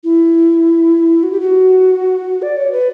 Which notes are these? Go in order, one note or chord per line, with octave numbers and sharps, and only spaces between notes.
E4
F#4
G4
F#4
D5
C#5
B4